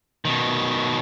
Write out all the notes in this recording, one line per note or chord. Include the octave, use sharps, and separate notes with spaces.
B2 D#3